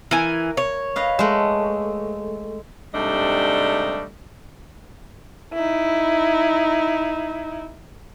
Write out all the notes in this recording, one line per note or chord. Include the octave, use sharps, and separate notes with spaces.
E3 A#4 G#5
C#5
B4 D#5 F5
G#3 A3
G#2 C3 G3 A3 D4 D#5
D#4 E4